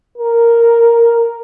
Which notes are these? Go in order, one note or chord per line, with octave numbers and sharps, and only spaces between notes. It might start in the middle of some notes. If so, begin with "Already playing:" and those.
A#4